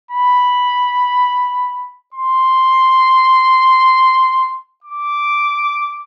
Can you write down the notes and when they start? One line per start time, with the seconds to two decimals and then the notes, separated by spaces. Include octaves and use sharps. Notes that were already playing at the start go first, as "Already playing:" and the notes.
0.11 B5
2.14 C6
4.84 D6